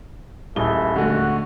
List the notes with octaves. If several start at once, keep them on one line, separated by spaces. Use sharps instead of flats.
D#1 A3 E4 G#4 G7
D3 G#3 A3 F#4